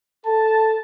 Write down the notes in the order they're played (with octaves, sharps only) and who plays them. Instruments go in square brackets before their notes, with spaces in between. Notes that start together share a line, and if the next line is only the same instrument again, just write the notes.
[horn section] A4 A5